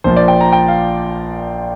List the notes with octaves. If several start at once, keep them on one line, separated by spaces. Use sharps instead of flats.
A#1 A#2 F3 C5
D5
G5
A#5
G5
F5